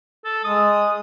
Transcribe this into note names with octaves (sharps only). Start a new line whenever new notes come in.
A4
G#3 D#6